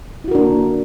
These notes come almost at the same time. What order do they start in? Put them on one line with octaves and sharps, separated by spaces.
E4 F#4 A#4 D4 A#3